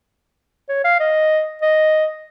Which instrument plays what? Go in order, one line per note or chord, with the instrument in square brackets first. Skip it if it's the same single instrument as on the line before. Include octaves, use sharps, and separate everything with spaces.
[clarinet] C#5
F5
D#5
D#5